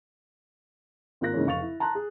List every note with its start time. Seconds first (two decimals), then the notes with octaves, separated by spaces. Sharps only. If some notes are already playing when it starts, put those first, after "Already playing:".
1.21 G#1 A#3 F4 F#6 A#6
1.34 G#2 C#3 E3 A#3 C#4
1.46 F1 F5 C#6 A6 F7
1.61 E4
1.80 A5 A#5 C6 F#6
1.95 G#4